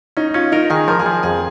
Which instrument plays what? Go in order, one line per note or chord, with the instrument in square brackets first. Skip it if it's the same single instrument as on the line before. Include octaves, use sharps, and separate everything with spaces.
[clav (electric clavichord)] C#4 [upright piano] D#4
[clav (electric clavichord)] C#4 [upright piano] F4
[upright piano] D#4 [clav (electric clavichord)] A#4
[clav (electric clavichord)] D#3 [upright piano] G#4
[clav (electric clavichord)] F3 [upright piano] A#4
[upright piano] G#4
[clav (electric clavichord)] F3
[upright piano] G#4
[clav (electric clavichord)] F2 [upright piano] G#4